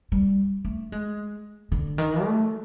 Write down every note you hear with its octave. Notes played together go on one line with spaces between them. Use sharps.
G3
A3
G#3
D3
D#3
A3